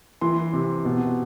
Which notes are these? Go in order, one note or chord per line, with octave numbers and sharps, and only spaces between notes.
E3 C6
C3
B2